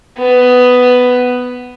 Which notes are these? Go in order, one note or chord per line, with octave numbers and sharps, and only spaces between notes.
B3